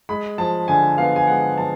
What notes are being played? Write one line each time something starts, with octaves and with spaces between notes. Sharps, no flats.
G#3 B5
F3 A5
D3 G#5
B3 F5
G#5
G#3 F#5
F3 A5